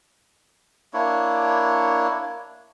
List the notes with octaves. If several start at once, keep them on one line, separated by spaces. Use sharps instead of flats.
A#3 D4 E4 C#5